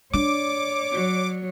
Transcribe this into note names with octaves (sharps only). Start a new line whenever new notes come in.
D4 C#5 D5 D6
F#3